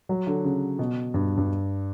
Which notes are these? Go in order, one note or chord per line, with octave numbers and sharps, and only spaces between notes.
F#3
D3
C#3
B2
G2
G2